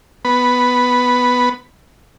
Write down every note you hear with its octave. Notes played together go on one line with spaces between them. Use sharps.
B3 B5